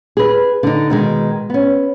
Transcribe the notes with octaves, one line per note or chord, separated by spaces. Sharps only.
G#4 B4
D3 D#4
B2 D#3 G#3
B3 C#4